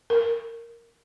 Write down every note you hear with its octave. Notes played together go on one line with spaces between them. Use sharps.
A#4